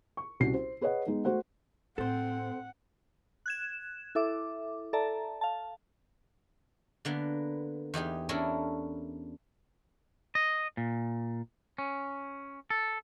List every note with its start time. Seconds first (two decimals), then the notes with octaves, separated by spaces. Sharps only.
0.17 C#6
0.40 C2 C#4 F#4 C7
0.54 C5
0.81 G#4 B4 C#5 D#5 F#5
1.07 G#3 B3 D#4 G#4
1.25 A3 F#4 C5 F#5
1.98 A2 C4 A4 C5 F#5
3.46 F#6 G#6 E7
4.15 E4 A4 E5 D6
4.93 A4 D5 E5 A5 A#5
5.41 F5 A5
7.05 D3 A#3 B3
7.94 E2 D#4 G4 G#4
8.29 C#4 D4 E4 A4 A#4 C#5
10.35 D#5
10.77 A#2
11.78 C#4
12.70 A4